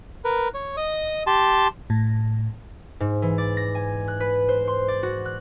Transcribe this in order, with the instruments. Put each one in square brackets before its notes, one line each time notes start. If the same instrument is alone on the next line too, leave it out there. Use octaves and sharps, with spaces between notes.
[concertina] A#4 B4
C#5
D#5 D#6
G4 A5 C6
[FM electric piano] A2
[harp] G#2
E3
D5
A#6
G#5
F#6
B4
C5
C6
D5
F#4
F#6